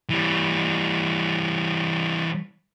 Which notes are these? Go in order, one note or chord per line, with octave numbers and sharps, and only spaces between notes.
E3 G3